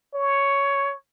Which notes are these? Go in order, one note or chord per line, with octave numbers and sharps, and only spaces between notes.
C#5